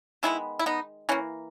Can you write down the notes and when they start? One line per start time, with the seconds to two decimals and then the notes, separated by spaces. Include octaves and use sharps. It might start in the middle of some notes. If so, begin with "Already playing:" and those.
0.23 D#3 G#3 B3 C#4 E4
0.59 E4
0.66 B3 D#4
1.09 E3 A#3 C#4